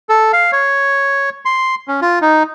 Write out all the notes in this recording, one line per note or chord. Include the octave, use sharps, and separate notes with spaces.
A4
F5
C#5
C6
C#4
F4
D#4